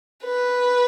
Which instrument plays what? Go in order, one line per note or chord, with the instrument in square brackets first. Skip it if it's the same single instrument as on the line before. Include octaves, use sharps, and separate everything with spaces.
[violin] B4